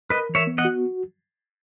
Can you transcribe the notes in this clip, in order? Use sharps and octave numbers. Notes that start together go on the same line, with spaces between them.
A#4 B4 D#5
E3
C#5 E5
B3
D#5 F#5
F#4